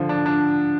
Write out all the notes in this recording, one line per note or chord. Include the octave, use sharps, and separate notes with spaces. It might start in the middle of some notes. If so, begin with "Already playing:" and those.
Already playing: D3 F3
D4
D4